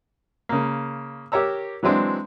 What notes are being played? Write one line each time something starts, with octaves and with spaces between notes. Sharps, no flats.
C#3 A#3
G4 A#4 C#5 A#5 E6
E3 F#3 G#3 C4 D4